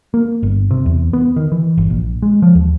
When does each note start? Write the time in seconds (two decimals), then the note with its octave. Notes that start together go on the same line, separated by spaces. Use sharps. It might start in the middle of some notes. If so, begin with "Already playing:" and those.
0.14 A#3
0.43 G1
0.71 C3
0.86 E2
1.13 B3
1.36 D#3
1.52 E3
1.78 G1
1.90 A#1
2.22 G#3
2.42 F3
2.55 D#2